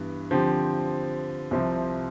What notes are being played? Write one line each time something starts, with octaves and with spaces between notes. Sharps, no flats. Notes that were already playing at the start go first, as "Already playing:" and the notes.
Already playing: G2 E3 B3
D3 F3 C4 G4
C2 C3 F3 C4